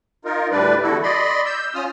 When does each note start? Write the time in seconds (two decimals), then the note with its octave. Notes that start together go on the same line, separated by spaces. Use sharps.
0.25 D#4 F4 A#4
0.51 D2 A2 G3 D4 B4 D5
0.83 E2 D3 E4 F#4 A4
1.03 D5 D#5 B5 C6
1.46 E6 G6
1.75 C#4 F4 D#6 F6